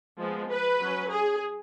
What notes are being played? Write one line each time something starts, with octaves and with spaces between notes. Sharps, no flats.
F3 G#3 B3
B4
F#3 C#4
G#4